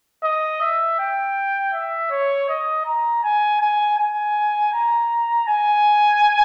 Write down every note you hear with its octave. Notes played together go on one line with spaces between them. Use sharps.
D#5
E5
G5
E5
C#5
D#5
A#5
G#5
G#5
G#5
A#5
G#5